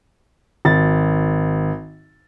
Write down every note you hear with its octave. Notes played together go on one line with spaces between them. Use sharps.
G#1 A6